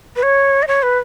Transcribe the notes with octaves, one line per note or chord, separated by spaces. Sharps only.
B4
C#5
D#5
C#5
B4